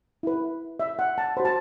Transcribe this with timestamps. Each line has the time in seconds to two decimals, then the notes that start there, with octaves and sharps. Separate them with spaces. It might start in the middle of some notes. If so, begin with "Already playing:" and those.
0.23 E4 B4
0.80 E5
0.99 F#5
1.18 A5
1.37 F#4 C5 B5
1.45 A5